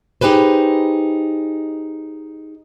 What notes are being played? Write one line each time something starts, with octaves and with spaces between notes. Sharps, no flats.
D#4 G4 G#4 B4 C5